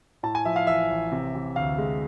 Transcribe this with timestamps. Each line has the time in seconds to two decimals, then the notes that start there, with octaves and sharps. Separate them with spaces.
0.23 A2 A5
0.35 G#5
0.45 F3 E5
0.56 F5
0.67 A1 E5
0.90 A1
1.12 C3
1.35 E3
1.56 D2 F5
1.78 G#3